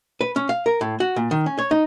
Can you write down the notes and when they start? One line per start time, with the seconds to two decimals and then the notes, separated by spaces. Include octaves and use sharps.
0.21 B4
0.36 C#4
0.49 F5
0.66 A#4
0.81 A2
1.00 F#4
1.16 A#2
1.31 D#3
1.46 C#4
1.59 C#5
1.71 D#4